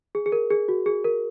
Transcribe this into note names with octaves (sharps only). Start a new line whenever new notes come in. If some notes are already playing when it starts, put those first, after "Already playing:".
G#4
G#4
A#4
G#4
F#4
G#4
A#4